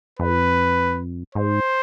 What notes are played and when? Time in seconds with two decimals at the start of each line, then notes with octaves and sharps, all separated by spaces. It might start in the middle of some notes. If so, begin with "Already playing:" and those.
0.19 F2 B4
1.35 G#2 C5